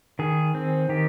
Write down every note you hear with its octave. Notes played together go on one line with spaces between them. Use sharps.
D#3 G#4
C4
D#3 G4